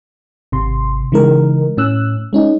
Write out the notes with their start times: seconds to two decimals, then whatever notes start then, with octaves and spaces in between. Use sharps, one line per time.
0.52 G#1 C3 C6
1.12 C#3 E3 G#3 D#4 A#4
1.77 A2 C#4 E6 F#6
2.33 G#3 C#4 D#4